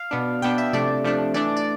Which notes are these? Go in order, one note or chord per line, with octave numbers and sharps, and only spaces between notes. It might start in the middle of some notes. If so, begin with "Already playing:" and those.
Already playing: F5
B2 B3 D4
B2 B3 D4 G5
E5
C3 F3 A3 D4 D5
C3 F3 A3 D4
E3 A3 D4 D5
D5